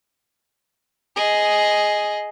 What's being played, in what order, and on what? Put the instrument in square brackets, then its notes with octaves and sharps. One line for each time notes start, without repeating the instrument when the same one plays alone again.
[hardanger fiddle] G#4 D#5